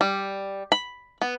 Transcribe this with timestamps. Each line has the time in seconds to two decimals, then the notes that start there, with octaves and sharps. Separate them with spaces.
0.01 G3
0.72 B5
1.22 B3